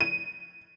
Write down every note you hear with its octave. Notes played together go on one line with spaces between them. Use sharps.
D#7